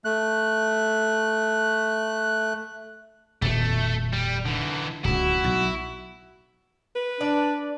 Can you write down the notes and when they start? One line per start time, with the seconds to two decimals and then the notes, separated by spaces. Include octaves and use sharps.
0.05 A3 F#6
3.42 D#1 F2 B2 A3
4.13 G3
4.45 D3 E3
5.04 D1 C#2 E4 F#4
5.44 B1
6.95 B4
7.21 D4 D5